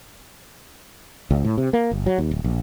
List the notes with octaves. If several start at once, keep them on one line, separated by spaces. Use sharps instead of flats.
C#2
A2
C3
A#3
G1
F#3
D#2
D1
A#1